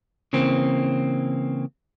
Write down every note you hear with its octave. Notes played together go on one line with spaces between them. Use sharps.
C#3 E3 A#3 C4